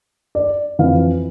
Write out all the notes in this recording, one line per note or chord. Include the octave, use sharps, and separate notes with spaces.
D5
F2 E3 F5